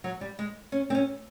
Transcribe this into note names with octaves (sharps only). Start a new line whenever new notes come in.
F#3
G3
G#3
C#4
C4
C#4